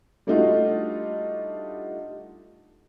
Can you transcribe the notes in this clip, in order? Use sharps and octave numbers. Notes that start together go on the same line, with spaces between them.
G3 A3 D4 D#4 F4 F#4